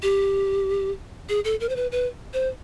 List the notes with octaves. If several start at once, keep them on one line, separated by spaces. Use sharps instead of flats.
G4
G#4
A4
A#4
C5
B4
B4
C5